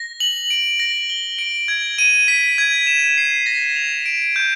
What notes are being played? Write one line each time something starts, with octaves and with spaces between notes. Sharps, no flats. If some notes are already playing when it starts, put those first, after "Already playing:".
Already playing: A#6
F#7
D7
A#6
G7
D7
G#6
D#7
B6
G#6
E7
C7
A#6
F7
D7
G6